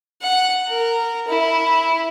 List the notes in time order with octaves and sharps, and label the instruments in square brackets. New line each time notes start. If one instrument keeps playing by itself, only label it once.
[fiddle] F#5
A#4
E4